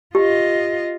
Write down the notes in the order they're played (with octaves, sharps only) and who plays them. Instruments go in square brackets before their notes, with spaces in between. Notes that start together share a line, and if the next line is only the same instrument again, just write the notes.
[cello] F4 D#5 [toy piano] G4